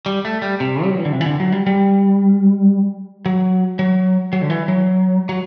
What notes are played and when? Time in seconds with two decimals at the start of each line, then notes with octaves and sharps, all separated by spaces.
0.06 G3
0.25 A3
0.42 G3
0.60 C3
0.83 G3
0.91 F#3
0.98 E3
1.05 D3
1.12 C3
1.21 E3
1.26 D3
1.40 F#3
1.52 G3
1.67 G3
3.26 F#3
3.79 F#3
4.33 F#3
4.42 D3
4.50 E3
4.68 F#3
5.29 F#3